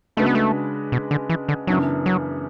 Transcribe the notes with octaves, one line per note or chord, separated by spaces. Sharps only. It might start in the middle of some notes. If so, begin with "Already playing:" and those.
C#3 G#3 A3 D4 F#4 B4
B3
A3
B2
D3
E3
D3
F#2 C#3 E3 F#3 B3 D4
F#3